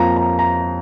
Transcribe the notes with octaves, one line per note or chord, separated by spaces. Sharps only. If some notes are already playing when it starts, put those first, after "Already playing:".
Already playing: F2 F3 A#3 A#5
A#5
A#5